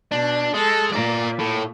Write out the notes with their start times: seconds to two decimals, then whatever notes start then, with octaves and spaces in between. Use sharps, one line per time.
0.12 B2 D4
0.54 G#3 A4
0.93 A#2 D5 A#5
1.40 A2